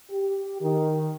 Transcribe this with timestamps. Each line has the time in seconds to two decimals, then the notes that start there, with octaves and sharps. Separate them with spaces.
0.10 G4
0.61 D#3